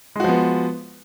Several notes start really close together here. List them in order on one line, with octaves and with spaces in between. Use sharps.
G#3 F#4 F3 B3